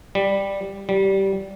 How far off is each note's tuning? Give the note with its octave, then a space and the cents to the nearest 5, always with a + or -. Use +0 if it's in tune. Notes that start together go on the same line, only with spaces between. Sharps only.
G3 +5
G3 -15